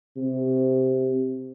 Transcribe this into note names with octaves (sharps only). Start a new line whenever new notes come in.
C3